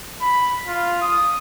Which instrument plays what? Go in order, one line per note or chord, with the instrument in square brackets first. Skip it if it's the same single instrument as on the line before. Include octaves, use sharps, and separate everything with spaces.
[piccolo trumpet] B5
F4
D#6